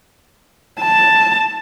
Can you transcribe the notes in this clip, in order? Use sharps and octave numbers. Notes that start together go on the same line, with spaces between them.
A5